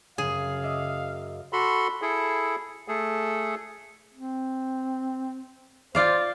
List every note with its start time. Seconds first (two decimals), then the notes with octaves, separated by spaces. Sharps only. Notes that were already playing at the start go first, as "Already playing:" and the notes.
0.18 F#2 C#3 G#4 F5
0.63 D#5 E5 D6
1.53 F#4 A4 B5 C6
2.02 E4 G#4 A4
2.88 A3 G#4 A4
4.14 C4
5.95 F4 C5 D5 F5